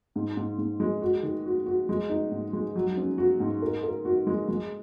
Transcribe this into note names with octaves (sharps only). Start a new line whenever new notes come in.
G#2
G#2
G#2
G#3
F#4
D#3
F#4
F#4
G#3
D#4
G#2
G#3
F#3
C#4
F#4
G#2
A#4
A#4
F#4
G#3
G#3